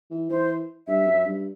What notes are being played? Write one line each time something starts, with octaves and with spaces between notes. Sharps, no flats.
E3
E3 C5
G2 E5
F#2
G2